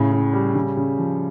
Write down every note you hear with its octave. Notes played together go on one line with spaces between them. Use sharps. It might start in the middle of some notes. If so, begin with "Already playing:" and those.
Already playing: A2 C#3
C#3
G3
C#3
C#3
F3